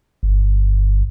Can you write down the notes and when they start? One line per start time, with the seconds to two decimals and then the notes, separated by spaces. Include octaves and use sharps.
0.23 G1